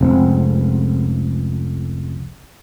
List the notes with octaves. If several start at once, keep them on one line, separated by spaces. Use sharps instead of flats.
F1 C#2 C4